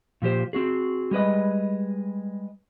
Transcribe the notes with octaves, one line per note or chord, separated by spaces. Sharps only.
A#2 F3 G4 C5
C4 F#4 G#4
G3 G#3 B4 D#5